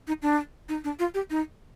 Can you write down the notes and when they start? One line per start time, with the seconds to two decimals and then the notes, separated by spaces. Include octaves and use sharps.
0.08 D#4
0.22 D4
0.69 D#4
0.84 D4
0.99 F4
1.14 G4
1.30 D#4